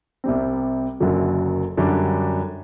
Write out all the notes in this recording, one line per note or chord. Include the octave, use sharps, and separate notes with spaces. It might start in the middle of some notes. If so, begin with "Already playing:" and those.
C2 C3 G3 C4
F#1 F#2 D3 F#3
F#2 D3 G3 D4